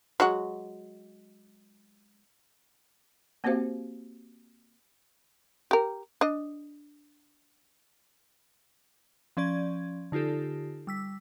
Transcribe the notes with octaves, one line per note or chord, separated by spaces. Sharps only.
F#3 G#3 F#4
A#3 C4 F#4 G4 C5 F5
G4 A#4
D4 D#5
F3 C#4 D5 G#6
D3 D#4 F4 G4 A4
G3 E6 B6